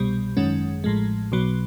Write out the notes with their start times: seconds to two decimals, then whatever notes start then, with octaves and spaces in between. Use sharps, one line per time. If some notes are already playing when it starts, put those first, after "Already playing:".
Already playing: C2 B2 G3
0.37 G#1 F#2 D#3 G#3 C#4
0.84 A1 A2 F3 G#3
1.32 B1 B2 F#3